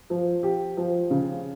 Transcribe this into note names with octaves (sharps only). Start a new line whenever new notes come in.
F3
G4
F3
C#3